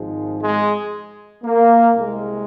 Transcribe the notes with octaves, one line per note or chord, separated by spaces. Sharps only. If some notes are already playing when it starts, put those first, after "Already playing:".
Already playing: G#1 G#2 F3 G#3
G#3
A#3
C2 C3 G#3